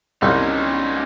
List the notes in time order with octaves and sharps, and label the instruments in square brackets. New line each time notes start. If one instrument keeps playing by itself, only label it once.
[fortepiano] C2 [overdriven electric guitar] C#4 D#4